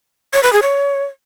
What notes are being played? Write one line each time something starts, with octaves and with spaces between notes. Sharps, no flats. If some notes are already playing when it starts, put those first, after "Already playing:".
C#5
B4
G#4
C#5